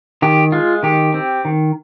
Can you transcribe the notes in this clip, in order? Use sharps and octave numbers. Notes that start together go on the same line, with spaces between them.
D#3 G4
G#3 F4
D#3 G4
C4
D#3